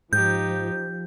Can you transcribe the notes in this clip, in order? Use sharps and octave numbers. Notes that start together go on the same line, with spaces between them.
G#2 F3 D#4 G4 G6